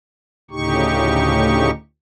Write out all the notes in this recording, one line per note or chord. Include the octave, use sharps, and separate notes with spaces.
D2 A2 C#3 D#4 G4 C#6